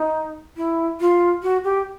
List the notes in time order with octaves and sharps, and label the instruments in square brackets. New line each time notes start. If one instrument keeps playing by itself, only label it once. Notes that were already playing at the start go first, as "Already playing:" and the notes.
Already playing: [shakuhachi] D#4
E4
F4
F#4
G4